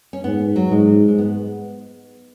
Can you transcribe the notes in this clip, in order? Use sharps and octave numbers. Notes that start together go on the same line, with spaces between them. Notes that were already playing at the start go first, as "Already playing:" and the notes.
C#4
G#2 B3
F#3
G#2 G#3
G#3
B3